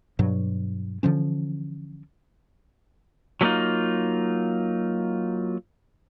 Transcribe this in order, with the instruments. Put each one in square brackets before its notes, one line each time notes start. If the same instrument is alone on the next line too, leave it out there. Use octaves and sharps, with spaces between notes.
[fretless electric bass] G2 B2 F#3
D3 E3 F3 C#4
[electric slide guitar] F#3 A3 A#3 C#4 D#4 F4